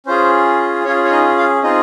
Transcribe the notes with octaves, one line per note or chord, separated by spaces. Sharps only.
C#4 F4 G#4 C5
C#4 F4 G#4 C#5
C#5
D#4 D#5
F4 F5
C4 D#4 F4 G#4 D#5